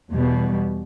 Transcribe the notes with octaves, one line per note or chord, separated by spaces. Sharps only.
E2 B2 G3